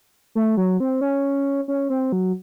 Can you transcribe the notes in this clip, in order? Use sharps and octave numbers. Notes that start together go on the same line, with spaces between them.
A3
F#3
C4
C#4
C#4
C4
F#3